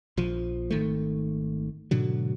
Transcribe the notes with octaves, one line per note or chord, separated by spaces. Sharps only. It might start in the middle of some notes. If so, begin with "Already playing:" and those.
A#1 F3
G#1 D#3 A3
G#2 B2 D3 F#3